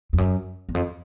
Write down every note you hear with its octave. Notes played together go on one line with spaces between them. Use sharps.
F2
F#2
E2
F2